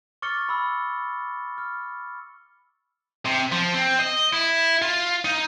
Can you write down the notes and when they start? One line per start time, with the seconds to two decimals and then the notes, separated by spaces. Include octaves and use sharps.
0.22 C#6 D6 F6 A6 C#7 G7
0.49 B5 E6
1.58 F6
3.26 C3
3.52 F3
3.74 C4
3.99 D#5
4.33 E4
4.82 F4
5.25 D#4